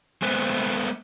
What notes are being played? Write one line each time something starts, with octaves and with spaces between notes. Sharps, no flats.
G#3 A3 B3 B4 C5